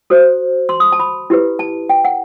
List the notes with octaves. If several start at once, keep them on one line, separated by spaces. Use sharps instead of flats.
F#4 A4 C5
C6
D#6
A5
B5
E4 G4 B4
A5
G5
F#5